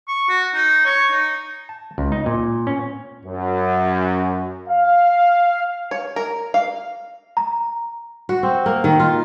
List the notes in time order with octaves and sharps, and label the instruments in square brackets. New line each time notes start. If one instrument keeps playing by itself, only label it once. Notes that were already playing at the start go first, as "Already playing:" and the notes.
[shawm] C#6
F#4
D#4
C#5
D#4
[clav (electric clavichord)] A5
C#2
D#4
A#2
C#4
[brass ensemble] F#2
F5
[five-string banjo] C#5
A#4
F5
[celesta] A#5
[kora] F#4
C4
A#3
D#3
F4